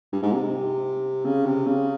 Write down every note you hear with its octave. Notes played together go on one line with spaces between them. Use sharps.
G2
G#2
C3
C#3
C3
C#3